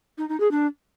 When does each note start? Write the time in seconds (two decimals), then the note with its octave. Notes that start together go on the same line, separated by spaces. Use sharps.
0.18 D#4
0.29 D#4
0.40 G#4
0.51 D4